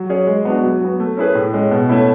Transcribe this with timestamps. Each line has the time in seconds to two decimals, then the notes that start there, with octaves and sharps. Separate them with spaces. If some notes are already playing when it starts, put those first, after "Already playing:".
Already playing: F#3
0.10 C#4 G#4 C#5
0.27 G#3
0.45 B3 D4 F#4
0.64 F#3
0.81 B3 F#4
1.00 A3
1.17 C#4 E4 G#4 B4
1.35 A2
1.53 G#3 C#4
1.71 B2
1.89 A3 C#4 E4